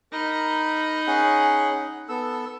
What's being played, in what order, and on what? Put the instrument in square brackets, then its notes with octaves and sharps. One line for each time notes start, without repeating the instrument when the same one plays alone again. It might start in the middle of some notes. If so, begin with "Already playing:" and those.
[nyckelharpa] D#4 B5 [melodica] A#4
[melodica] C#4 G#4 F#5
B3 A4 E6